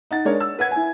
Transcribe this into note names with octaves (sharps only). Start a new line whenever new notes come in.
D#4 F#5 A6
G#3 D4 A#4 C#5
E6
B4 F#5 G#6
E4 G#5